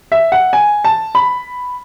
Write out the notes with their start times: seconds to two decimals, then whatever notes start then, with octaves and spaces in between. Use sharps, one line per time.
0.12 E5
0.32 F#5
0.53 G#5
0.84 A5
1.15 B5